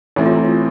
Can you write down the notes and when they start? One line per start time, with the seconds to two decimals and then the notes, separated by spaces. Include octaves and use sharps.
0.16 A1 A2 E3 A3 C4 G4
0.26 F4
0.36 E4
0.45 F4